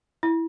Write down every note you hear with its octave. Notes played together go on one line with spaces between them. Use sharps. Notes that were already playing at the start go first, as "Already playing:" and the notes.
E4